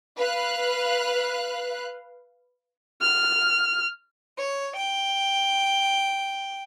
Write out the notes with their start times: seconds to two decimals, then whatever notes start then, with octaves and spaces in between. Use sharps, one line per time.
0.17 B4 F5 F#6
3.01 F6
4.38 C#5
4.75 G5